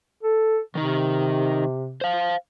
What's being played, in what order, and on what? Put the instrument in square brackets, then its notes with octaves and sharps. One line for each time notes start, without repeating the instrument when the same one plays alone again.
[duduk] A4
[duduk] C3 [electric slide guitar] D#3 D#4
[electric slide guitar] C5 F5